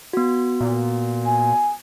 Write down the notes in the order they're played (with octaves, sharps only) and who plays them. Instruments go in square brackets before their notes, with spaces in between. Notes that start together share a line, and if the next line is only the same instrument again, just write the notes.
[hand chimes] B3 F#4
[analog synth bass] A#2
[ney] G#5